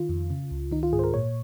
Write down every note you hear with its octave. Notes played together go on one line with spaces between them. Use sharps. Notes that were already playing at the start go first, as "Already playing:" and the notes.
Already playing: D#3 F4
F2
C#3
C#2
D#3 D#4
F4
G#2 G#4
C5
A#4
A#2 C#5